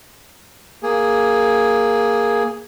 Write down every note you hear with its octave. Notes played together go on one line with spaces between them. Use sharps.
A#3 G#4